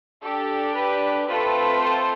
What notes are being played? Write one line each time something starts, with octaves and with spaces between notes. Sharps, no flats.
D4 G4 A4
B4
A3 C4 F4 A4 B4
A4 C5